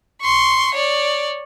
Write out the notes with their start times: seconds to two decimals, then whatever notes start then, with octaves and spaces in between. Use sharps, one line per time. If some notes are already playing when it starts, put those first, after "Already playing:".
0.22 C6 C#6
0.75 C#5 D5